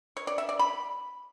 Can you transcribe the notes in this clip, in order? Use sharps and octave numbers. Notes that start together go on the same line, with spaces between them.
C#5
D5
E5
D5
B5